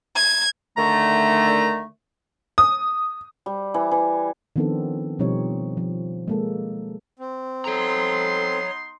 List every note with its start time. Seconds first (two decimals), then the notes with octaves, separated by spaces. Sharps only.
0.17 G#6
0.77 D3 D#3 A3 A#5
2.58 D#6
3.46 G3
3.74 E3
3.91 E3
4.56 D#3 F3 B3 C4 D4 A4
5.19 B2 F3 G3 C4 D#4 C#5
5.77 F3
6.28 G#3 A#3 A4
7.19 C4
7.66 B3 D#4 A4 C#5 A#5 C6